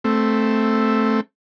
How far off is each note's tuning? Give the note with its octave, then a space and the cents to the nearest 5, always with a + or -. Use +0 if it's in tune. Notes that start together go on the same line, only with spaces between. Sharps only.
A3 +0 C4 +0 E5 +0